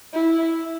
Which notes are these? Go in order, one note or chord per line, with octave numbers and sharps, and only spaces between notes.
E4